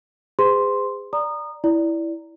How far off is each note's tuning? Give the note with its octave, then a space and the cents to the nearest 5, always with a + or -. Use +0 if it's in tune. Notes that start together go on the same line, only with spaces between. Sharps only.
G#4 -30 C5 -45 C6 +0
D5 +0 A#5 +0 D#6 -25
E4 +0 D5 -10